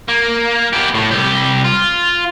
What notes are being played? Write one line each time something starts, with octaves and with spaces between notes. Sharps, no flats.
A#3
B3 G4
A2
C2 G4
F4